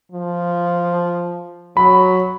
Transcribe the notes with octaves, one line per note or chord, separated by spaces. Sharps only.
F3
F#3 B5